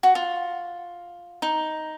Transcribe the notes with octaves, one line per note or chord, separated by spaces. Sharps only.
F#4
F4
D#4